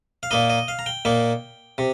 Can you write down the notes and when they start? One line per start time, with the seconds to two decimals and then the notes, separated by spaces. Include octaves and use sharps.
0.23 F5
0.31 A#2 A#3 D#4 D#5
0.50 D#5
0.68 F5
0.79 A#5
0.86 G5
1.05 A#2 A#3 D#4
1.78 C3